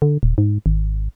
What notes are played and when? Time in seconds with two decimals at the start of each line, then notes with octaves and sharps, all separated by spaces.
0.02 D3
0.23 D#1
0.38 G#2
0.66 G#1